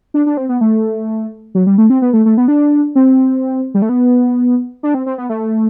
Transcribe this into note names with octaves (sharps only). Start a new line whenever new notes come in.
D4
D4
C4
B3
A3
F#3
G3
A3
C4
B3
A3
A3
B3
D4
C4
G3
A3
B3
D4
C4
C4
B3
A3